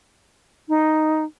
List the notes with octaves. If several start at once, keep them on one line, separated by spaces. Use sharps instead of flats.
D#4